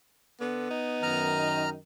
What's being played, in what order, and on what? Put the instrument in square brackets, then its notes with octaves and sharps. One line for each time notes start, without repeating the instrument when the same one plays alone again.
[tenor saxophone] D3 [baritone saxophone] B3
[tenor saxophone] D#4
[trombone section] F#2 D#3 [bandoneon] A#5 F6